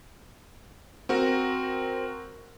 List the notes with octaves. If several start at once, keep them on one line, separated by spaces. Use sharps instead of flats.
C4 F#4 A#4